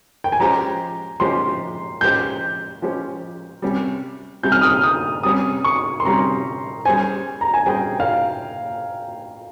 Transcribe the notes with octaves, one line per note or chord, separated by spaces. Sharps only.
G5
G#5
F3 G#3 C#4 G4 C5 A#5
F3 G#3 C#4 G4 C5 C6
F3 G#3 C#4 G4 C5 G6
F3 G#3 C#4 G4 C5
C3 G3 C#4 G4
C3 G3 C#4 G4 G6
F6
D#6
F6
D#6
C3 G3 C#4 G4 D#6
C#6
C6
C3 G3 C#4 G4 A#5
G3 C#4 G#4 C5 G#5
A#5
G#5
G3 C#4 G#4 C5 G5
F5